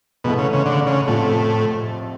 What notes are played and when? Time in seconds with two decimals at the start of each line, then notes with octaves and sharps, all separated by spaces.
0.24 G#2 B2 E3 A3
0.38 C#3
0.53 C#3
0.66 D3
0.87 C#3
1.07 F2 A2 C3 F3